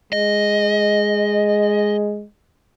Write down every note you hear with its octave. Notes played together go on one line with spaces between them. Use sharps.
G#3 D#5